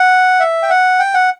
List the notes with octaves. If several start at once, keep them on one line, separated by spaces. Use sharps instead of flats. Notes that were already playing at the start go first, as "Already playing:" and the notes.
Already playing: F#5
E5
G5
F#5
G5
F#5